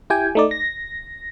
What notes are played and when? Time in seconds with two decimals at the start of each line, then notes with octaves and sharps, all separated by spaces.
0.10 E4 G4 G5 G#5
0.35 A3 D#4 D5
0.51 A#6